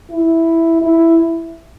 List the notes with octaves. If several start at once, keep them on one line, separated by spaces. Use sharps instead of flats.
E4
E4